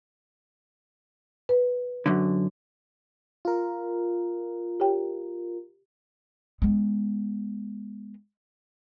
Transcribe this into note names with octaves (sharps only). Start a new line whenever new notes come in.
B4
F#2 D3
F4 A#4
G4 C#5 G5
G#3 B3